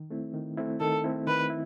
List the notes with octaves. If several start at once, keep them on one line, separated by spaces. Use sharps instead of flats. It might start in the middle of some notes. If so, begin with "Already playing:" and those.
Already playing: D#3
A3 C4 E4
D#3
A3 C4 E4
D#3 A4
A3 C4 E4
D#3 B4
E4